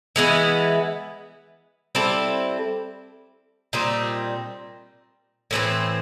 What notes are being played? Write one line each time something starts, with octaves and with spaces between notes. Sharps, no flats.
E3 G#3 B3 E4
G3 C4 E4 A4
A#2 G3 C4 D#4
A2 E3 A3 C4